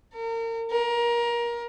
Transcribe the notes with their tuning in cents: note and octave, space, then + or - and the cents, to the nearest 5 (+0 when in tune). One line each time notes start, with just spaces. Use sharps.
A#4 -35
A#4 +25